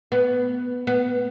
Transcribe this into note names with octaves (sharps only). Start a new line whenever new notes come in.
B3
B3